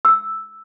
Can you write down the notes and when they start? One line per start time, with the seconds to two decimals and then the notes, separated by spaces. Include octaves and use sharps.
0.05 E6